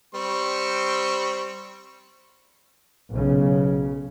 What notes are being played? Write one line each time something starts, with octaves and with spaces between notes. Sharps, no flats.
G3 C4 C#6
B1 C#3